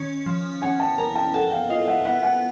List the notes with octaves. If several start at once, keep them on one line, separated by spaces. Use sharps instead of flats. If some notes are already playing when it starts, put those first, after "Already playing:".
Already playing: D#3 C#4
F3
C#4 F#5 G#5
G5 A5
A#4 G#5 A#5
G5 A5
A4 F#5 G#5
F5 G5
F4 D#5 F5
E5 F#5
B3 E5 F#5
F#5 G#5